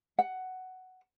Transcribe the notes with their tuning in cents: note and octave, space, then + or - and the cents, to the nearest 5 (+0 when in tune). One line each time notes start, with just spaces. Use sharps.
F#5 +10